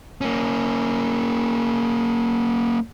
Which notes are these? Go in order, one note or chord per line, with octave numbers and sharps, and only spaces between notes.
A#3 C#4